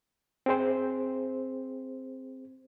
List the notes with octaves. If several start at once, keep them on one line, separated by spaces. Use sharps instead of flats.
C4 G#4 C5